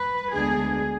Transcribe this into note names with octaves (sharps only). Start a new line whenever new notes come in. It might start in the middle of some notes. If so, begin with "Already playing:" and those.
Already playing: B4
D2 D3 G#3 B3 D4 G#4